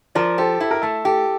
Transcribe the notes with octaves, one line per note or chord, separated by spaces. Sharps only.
F3 A#4 D5
G4 A4 C5
E4 A4
A#4
A3 A4
G4 A4